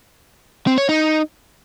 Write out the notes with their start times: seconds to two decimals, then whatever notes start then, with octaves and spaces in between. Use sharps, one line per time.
0.67 C4
0.78 C#5
0.89 D#4